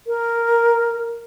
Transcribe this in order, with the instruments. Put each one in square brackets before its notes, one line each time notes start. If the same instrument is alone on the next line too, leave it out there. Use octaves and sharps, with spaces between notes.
[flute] A#4